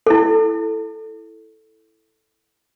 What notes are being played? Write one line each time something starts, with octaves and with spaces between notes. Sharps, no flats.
E4 A4